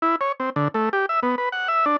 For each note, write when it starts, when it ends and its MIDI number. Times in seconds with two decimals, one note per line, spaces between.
0.02 0.16 64
0.21 0.32 73
0.40 0.50 60
0.56 0.68 50
0.74 0.89 57
0.93 1.06 67
1.09 1.20 76
1.23 1.35 59
1.38 1.49 71
1.52 1.68 78
1.68 1.85 76
1.86 1.96 62